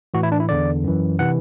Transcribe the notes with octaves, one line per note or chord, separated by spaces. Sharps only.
A2 E3 F#4
E4
D4
E4
E2 D3 D5
F#2 E3
C3 E3 F#5